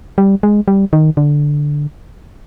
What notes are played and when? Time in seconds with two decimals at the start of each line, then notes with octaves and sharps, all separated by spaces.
0.18 G3
0.43 G#3
0.68 G3
0.93 D#3
1.17 D3